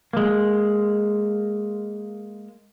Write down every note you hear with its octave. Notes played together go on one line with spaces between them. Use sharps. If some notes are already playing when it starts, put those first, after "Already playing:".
G#3 A#3